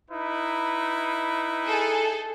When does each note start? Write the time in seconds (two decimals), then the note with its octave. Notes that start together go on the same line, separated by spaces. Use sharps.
0.11 D#4 E4 B4
1.65 G#4 A4